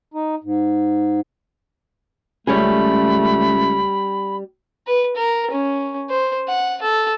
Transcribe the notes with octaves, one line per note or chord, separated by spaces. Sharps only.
D#4
G#2
C#2 G3 A3 C#4 G#4 B5
B4
A#4
C#4
C5
F#5
A4